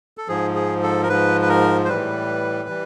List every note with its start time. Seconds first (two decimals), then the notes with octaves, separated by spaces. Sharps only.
0.18 A4
0.28 G#2 F3 G#4
0.55 G#4
0.83 A4
1.03 A#4
1.09 G#2 F3 B4
1.41 B4
1.49 A#4
1.85 C5
1.88 A2 E3 G3 B4
2.69 E3 G3